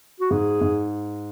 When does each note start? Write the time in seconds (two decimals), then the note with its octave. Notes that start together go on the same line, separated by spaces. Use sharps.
0.20 F#4
0.31 G#2 G#4
0.61 G#2